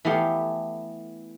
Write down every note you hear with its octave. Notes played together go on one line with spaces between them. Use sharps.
E3 A3 B3 G4 F5